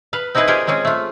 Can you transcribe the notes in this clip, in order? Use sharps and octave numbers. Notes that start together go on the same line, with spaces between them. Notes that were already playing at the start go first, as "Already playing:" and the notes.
B4 F5
C4 D#4 E4 G#4 B4 D#5
F4 G4 G#4 A#4 D5 D#5
G#3 C4 C#4 G#4
A3 F4